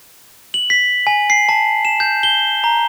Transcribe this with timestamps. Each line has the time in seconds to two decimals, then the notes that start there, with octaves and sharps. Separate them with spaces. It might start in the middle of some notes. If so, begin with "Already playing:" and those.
0.54 F#7
0.70 B6
1.07 G#5
1.30 C7
1.49 A5
1.85 E7
2.00 G6
2.23 G7
2.64 A#5